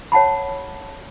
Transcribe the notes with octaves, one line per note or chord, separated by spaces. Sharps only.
C#5 F#5 A5 B5